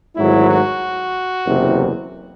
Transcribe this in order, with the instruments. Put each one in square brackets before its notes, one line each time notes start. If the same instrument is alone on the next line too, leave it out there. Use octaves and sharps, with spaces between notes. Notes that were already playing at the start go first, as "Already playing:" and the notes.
[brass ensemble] G#1 G#2 F#3 A3 E4
F#4
F#1 E2 C3